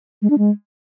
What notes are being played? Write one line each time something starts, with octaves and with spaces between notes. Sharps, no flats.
G#3
D4
G#3